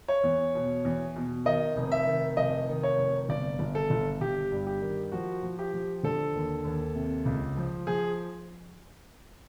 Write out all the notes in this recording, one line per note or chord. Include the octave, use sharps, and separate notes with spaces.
C#5
E2
B2
E2
B2
D#3 D#5
F1
E5
D#3
F1 D#5
D#3
C#5
F1
G1 D5
G1
A4
G1
G1 G4
G2
G4
D#3
F3 F#4
F3
G4
F3
D3 A4
D#2
D#2
C3
C#2
F3
F3 G#4